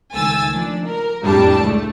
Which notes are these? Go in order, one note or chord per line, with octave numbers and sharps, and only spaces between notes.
C#2 D#3 A3 G#5 E6 A6
F3 D4
A#4
F2 A2 G3 D4 A5
C#2 A3